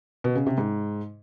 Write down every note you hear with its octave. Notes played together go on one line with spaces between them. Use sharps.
B2
C#3
C3
G#2